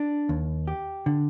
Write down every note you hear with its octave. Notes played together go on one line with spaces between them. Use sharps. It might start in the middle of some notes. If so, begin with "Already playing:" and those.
Already playing: D4
D#2
G4
D3